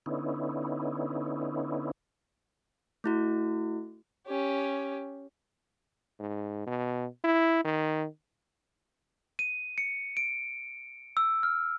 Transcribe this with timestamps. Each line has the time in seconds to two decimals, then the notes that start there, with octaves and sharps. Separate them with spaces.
0.06 D3 B3 C#4 D#4 E4
3.04 A3 E4 F#4
4.27 C#4 G4
6.19 G#2
6.67 B2
7.24 E4
7.65 D#3
9.39 D#7
9.78 C#7
10.17 D7
11.17 E6
11.43 F6